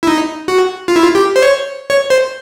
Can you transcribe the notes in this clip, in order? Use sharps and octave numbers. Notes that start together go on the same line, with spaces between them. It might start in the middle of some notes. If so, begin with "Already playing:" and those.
E4
D#4
F#4
F4
E4
F4
G4
C5
C#5
C#5
C5